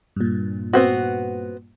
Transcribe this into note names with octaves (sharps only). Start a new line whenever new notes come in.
G2 A#2
B3 C4 F#4